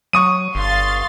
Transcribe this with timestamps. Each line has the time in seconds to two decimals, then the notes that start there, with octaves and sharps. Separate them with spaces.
0.13 F#3 C#6 D#6 D#7
0.55 G1 F5 C6 A6